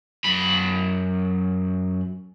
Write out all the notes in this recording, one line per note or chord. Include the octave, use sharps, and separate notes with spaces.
F#2 B5